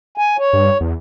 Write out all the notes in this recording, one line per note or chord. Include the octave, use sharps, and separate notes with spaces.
G#5
C#5
G2
E2